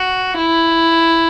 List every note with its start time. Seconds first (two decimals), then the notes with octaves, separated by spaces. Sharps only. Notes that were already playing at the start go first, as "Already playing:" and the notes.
Already playing: F#4
0.38 E4